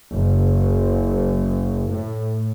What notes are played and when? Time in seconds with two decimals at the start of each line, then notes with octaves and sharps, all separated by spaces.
0.13 F#1
1.94 A2